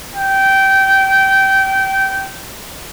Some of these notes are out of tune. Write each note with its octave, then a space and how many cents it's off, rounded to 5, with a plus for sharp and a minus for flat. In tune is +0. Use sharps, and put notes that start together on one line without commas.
G5 -20